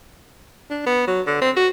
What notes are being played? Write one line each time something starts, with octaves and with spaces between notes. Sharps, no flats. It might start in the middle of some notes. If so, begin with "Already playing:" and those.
D4
B3
F#3
D3
C4
F#4